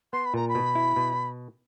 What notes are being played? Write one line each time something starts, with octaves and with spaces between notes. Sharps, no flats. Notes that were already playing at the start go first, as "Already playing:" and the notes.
B3 C6
B5
A#2 A#5
B5
B2
E4
B2